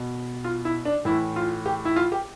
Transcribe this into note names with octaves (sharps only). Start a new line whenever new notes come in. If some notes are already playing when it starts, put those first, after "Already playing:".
Already playing: B2
F4
E4
D4
A2 E3 E4
F4
G4
E4
F4
G4